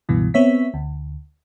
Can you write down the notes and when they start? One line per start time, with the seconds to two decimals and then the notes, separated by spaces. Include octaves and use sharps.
0.09 C#2 G2 B2 E3
0.34 B3 C4 C#5 E5 B6
0.74 D2